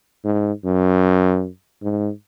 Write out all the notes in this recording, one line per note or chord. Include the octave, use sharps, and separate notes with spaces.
G#2
F#2
G#2